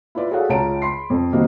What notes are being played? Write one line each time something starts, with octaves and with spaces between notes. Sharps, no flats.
E4 F4 B4 D5
F#4 G#4 A4 C#5 F5 F#5
C#2 F4 C#5 A5 A#5 D7
B5 C6 C7
F2
D#3 G3 A#3 C4 F#4 D#5